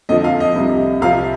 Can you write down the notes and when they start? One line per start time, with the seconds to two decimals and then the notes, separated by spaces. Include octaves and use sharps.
0.09 F2 D3 F3 D#5
0.24 F5
0.40 D#5
0.55 C2 C3 G3
1.01 C2 C3 F3 F5